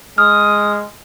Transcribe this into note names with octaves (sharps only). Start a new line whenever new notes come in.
G#3 D#6 F6